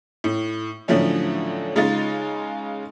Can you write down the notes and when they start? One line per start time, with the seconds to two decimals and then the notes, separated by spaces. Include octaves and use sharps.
0.24 A2
0.88 A2 D3 F3 F#3 A3 C#4
1.76 C#3 G#3 D#4 F4 A6